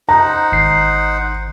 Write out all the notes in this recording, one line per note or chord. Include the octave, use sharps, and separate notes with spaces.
D#4 C5 F#5 A#5
G#1 C7